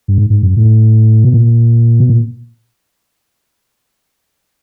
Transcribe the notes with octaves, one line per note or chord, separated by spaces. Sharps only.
G2
G#2
G#2
F#2
A2
B2
A#2
B2
A#2